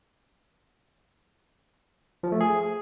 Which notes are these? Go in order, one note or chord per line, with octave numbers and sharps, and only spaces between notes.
F3
A3
G#4